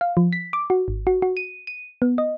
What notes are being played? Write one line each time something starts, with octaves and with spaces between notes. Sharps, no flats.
F5
F3
B6
D6
F#4
G#1
F#4
F#4
D#7
D#7
B3
D#5